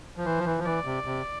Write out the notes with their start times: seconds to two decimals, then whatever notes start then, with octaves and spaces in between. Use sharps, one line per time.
0.17 F3
0.25 E3 C5
0.39 F3
0.46 E3
0.58 F3
0.66 E3 D5
0.85 C3
1.06 C3